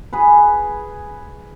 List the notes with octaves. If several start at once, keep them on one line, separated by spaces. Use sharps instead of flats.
G#4 B4